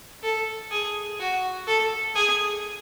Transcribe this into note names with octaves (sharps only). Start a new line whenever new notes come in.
A4
G#4
F#4
A4
G#4